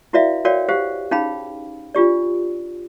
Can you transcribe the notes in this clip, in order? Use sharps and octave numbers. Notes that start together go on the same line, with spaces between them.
E4 F#4 B4 D5 E5 F5
F#4 A#4 C#5 D5 F5 G5
G4 C5 F5 F#5
C#4 D#4 G#4 F5 G5 B5
D4 F4 G4 D5